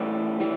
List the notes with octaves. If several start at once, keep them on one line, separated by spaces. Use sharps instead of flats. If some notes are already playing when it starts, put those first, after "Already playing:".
Already playing: A2 E3 G3
E3 G3